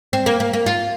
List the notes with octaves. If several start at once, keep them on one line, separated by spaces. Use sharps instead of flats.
C4
A#3
A#3
A#3
F4